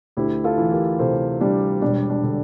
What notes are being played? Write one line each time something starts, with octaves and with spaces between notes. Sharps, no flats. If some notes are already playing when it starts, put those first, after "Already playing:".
D2 E4 G4
F4 A4
E3
G4 A#4
C3 A4 C5
G3 D4
E1 D4
D4
D3